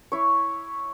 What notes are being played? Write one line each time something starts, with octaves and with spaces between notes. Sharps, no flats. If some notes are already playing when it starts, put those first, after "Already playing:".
E4 C#5